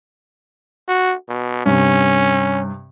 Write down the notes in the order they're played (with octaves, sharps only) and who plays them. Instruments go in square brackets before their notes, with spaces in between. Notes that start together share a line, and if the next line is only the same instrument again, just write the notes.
[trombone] F#4
B2
[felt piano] G2 C3 [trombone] C#4